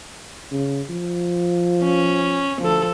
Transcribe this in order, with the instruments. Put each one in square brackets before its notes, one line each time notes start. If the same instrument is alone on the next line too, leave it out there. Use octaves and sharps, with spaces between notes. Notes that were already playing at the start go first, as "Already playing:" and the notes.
[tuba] C#3
F3
[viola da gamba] C#4
[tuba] D2 [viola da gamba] F3 A4